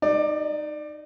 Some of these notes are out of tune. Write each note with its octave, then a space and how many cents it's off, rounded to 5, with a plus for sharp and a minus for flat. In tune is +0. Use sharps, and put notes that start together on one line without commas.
D#4 -15 D5 +20